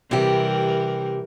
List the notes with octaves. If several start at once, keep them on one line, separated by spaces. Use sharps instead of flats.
C3 E3 G3 G4 A#4